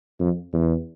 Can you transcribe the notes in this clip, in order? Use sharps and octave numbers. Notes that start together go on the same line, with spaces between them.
F2
E2